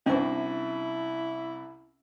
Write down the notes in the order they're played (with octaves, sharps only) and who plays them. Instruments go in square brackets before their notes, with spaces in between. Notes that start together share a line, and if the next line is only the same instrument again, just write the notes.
[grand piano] C2 C3 [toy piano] C#4 [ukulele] D4 F#4 C5 [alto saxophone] E4